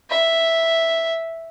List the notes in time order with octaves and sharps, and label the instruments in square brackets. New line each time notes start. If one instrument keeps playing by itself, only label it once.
[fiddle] E5